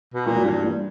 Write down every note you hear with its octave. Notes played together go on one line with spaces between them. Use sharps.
B2
A#2 E3 G3
F#3
G2 E3 G3
E3 G3